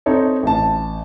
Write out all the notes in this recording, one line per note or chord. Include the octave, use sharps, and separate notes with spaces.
C4 D#4 A4 C#5
A1 A5